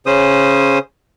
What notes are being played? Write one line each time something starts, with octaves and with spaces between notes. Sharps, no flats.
C#3 C#4 C5 D#6